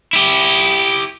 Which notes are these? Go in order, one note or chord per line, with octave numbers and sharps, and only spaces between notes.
E4 G4